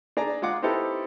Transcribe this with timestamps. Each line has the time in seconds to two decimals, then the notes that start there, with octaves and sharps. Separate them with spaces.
0.17 D4 G#4 D5 G#5 A#5
0.42 G#3 F4 G#4 F#5 D6
0.62 C4 D#4 E4 G4 A4 B4